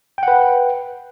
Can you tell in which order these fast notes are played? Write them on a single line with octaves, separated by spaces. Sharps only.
G5 F#5 B4